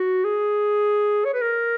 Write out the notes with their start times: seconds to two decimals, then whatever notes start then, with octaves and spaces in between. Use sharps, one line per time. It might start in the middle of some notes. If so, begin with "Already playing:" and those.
Already playing: F#4
0.25 G#4
1.25 C#5
1.34 B4
1.42 A#4